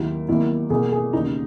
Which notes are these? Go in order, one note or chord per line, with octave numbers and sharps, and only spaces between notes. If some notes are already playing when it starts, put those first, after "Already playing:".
Already playing: D#2 D#3 F#3 A#3 E4
E2 D#3 F#3 A#3 E4
E2 B2 A#3 G#4
G#4
E1 D#2 C#3 D#4